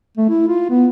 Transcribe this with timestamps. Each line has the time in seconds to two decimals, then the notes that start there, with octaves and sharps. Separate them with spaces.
0.17 A3
0.29 E4
0.48 F4
0.70 B3